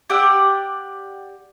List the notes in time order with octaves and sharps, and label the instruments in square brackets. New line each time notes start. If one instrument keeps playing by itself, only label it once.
[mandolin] G4 D5 F#5 E6